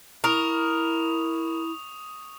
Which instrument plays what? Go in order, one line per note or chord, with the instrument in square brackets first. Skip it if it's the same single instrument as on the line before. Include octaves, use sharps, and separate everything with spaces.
[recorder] E4 [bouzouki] A#4 [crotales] C#6 D#6 F7